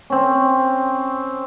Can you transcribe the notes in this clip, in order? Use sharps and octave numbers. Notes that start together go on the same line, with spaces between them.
C4 C#4